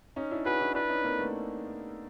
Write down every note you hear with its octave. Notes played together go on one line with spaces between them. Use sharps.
C#4 D#4
D4 E4
F#4 G#4 B4
D4 E4
D4 E4 B4
C#4 D#4
A#3 C4
A3 B3